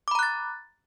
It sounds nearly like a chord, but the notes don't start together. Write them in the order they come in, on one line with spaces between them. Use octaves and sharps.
D6 B5 A#5 F#6 A6